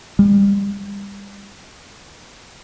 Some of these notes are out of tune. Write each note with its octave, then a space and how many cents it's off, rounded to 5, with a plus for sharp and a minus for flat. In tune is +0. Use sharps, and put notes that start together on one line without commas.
G3 +40